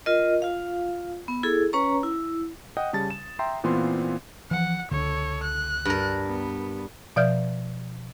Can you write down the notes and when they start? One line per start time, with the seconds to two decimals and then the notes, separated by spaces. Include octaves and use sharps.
0.06 F4 A#4 D#5
0.42 F4 F5
1.28 B3
1.43 E4 G#4 A4
1.73 C#4 B4 C#5 A#5 C#6
2.03 E4
2.77 D#5 F#5 G5 D#6
2.93 C#3 G3 A5 A6
3.10 E7
3.39 E5 G5 A#5 C6
3.64 A#2 E3 B3 C4 F4 C6
4.51 E3 F3 F#5
4.91 C#2 D3 A4 C#5
5.44 F#6
5.85 G2 A#4
6.26 B3
7.16 B2 F3 D5 E5 F6 G6